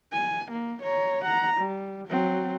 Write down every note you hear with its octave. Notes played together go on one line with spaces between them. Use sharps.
G#5
A#3
C#5 A#5
F#5 A#5
G3
F#3 C4